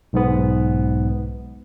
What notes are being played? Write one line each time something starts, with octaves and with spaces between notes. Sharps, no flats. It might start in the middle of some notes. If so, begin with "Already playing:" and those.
B1 G#2 B3